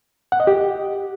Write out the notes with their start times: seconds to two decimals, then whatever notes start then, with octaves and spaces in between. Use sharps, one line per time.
0.32 F#5
0.40 D#5
0.47 G4